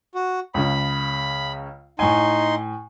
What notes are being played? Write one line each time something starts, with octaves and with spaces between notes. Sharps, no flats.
F#4
C#2 C#3 B5
A2 D#4 G#5 C6